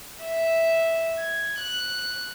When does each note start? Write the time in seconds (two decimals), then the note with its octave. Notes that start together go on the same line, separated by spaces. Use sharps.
0.23 E5
1.17 G#6
1.58 F#6